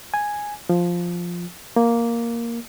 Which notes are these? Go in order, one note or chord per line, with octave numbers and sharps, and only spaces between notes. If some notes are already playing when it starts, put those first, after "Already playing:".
G#5
F3
A#3